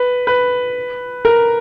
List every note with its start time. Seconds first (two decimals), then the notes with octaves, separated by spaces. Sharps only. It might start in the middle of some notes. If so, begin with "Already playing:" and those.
Already playing: B4
0.27 B4
1.25 A#4